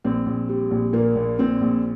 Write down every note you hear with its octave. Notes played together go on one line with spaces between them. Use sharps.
A#1 C4
A#1
G3
A#1
A#2 A#3
A#1
A#2 C4
A#1